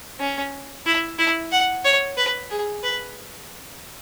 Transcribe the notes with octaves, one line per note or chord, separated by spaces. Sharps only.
C#4
E4
E4
F#5
C#5
B4
G#4
B4